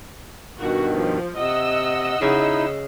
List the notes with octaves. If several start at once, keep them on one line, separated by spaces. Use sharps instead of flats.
G2 B2 D#3 F#4
F3
C3 D#5 F#5 E6
C#3 C#4 D#4 E4